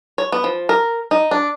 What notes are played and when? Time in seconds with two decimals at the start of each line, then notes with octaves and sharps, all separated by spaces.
0.18 C#5
0.32 B3
0.44 F3
0.69 A#4
1.11 D#4
1.31 D4